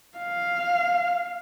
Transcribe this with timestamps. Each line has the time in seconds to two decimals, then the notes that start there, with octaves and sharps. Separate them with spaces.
0.18 F5